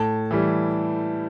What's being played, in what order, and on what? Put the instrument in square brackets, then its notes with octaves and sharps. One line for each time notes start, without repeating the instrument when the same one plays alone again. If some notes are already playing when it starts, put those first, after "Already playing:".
Already playing: [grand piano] A2 A5
E3 G3